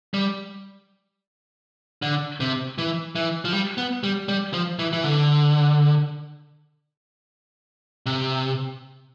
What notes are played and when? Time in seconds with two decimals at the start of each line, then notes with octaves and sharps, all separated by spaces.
0.14 G3
2.02 D3
2.40 C3
2.78 E3
3.16 E3
3.45 F3
3.52 G3
3.78 B3
4.03 G3
4.29 G3
4.53 F3
4.79 E3
4.93 E3
5.04 D3
8.06 C3